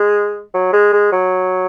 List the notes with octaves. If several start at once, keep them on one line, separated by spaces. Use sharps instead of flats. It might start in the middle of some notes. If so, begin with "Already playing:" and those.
Already playing: G#3
F#3
G#3
G#3
F#3